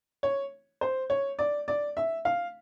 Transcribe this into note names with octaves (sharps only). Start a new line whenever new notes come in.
C#5
C5
C#5
D5
D5
E5
F5